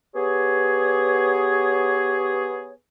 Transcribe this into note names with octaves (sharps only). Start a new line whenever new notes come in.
B3 G4 G#4 C#5